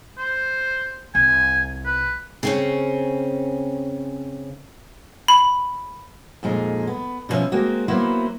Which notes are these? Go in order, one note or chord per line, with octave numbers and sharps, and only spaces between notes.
C5
C2 G#5
B4
C#3 C4 C#4
B5
F2 A#2 G#3 D#4
B3
B2 D3 F3 C#4 E5
G#3 A#3 C4 F#4
F#3 A#3 B3 E4 C5